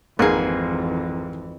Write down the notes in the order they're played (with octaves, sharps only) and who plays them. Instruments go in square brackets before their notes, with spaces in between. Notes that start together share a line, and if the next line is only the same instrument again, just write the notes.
[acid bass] G#1 [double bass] F2 E3 [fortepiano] G#2 A#3 [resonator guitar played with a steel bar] G#4 B4